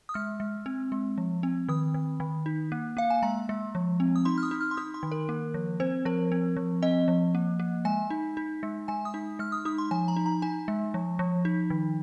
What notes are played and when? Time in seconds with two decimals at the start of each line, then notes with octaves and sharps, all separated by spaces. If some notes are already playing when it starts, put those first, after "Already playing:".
0.09 D#6
0.14 G#3 F6
0.40 G#3
0.66 C4
0.92 G#3
1.18 F3
1.43 C4
1.68 D#3 D#6
1.94 D#3
2.20 D#3
2.46 D#4
2.72 A#3
2.97 A#3 F5
3.10 G#5
3.22 G#3 A#5
3.49 G#3
3.75 F3
4.00 C4
4.16 D#6
4.25 D#4 C6
4.38 F6
4.43 D#6
4.51 D#4
4.61 F6
4.71 C6
4.77 D#4 D#6
4.94 C6
5.03 D#3
5.12 A#4
5.29 A#3
5.54 F3
5.80 C4 C5
6.05 F3 A#4
6.32 C4
6.57 F3
6.82 C4 D#5
7.08 F3
7.35 A#3
7.60 A#3
7.85 G#3 G#5
8.10 D#4
8.37 D#4
8.63 G#3
8.88 G#3 G#5
9.05 D#6
9.14 D#4
9.39 G#3 F6
9.52 D#6
9.65 D#4 D#6
9.78 C6
9.91 F3 G#5
10.08 A#5
10.16 D#4
10.26 A#5
10.42 D#4 G#5
10.68 G#3
10.94 F3
11.19 F3
11.45 D#4
11.70 D#3